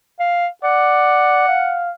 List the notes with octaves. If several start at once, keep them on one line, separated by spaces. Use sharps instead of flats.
F5
D5 F#5
F5